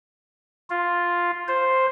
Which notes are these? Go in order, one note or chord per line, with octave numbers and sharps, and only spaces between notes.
F4
C5